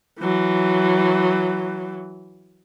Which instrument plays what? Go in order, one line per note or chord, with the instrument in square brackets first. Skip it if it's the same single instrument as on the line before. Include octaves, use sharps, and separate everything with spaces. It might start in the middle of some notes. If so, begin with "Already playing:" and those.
[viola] E3 F#3